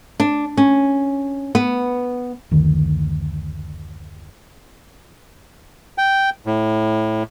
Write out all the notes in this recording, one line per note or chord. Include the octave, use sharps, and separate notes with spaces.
D4
C#4
B3
F#1 D2 D#3
G5
A2